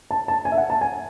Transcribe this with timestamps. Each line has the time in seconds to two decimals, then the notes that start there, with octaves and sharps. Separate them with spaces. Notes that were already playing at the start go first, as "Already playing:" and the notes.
0.11 A5
0.28 A5
0.45 G#5
0.52 E5
0.58 F#5
0.70 A5
0.81 G#5